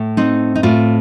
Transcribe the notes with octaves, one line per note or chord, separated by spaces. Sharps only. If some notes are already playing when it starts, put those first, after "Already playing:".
Already playing: A2
C4 D#4
D#4
A2 F4